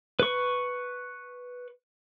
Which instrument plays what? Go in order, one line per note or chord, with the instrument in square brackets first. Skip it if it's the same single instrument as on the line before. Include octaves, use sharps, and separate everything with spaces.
[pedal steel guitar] B4 C#6